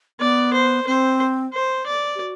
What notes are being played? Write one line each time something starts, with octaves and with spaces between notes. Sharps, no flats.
B3 D5
C5
C4 C5
C5
D5
G4
F#4